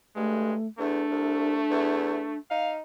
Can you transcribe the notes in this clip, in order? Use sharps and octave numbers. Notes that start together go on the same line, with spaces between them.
G2 G#3 A3
E2 A3 D4
C2
E2
D#4 F5